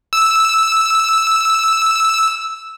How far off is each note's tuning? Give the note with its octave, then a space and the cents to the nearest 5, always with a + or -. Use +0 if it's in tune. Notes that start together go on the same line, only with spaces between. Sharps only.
E6 -5